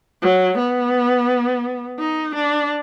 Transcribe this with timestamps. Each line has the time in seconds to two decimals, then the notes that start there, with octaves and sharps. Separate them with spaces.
0.22 F#3
0.58 B3
1.99 D#4
2.35 D4